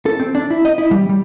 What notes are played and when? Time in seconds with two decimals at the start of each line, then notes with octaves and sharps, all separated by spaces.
0.06 A4
0.20 C4
0.35 D4
0.50 E4
0.65 D#5
0.78 E4
0.91 G3
1.09 G3